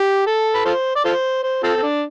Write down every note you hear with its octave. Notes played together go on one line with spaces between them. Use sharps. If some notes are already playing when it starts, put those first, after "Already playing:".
Already playing: G4
A4
B4
F4 A4 C5
D5
F4 A4 C5
C5
C4 F4 A4
C4
D4